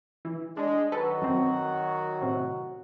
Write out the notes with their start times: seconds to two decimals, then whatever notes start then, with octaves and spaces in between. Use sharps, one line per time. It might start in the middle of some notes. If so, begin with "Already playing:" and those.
0.25 E3
0.57 G#3 D4
0.92 D#3 F#3 F#4 A4 B4
1.22 F#2 C4
2.21 A2 C3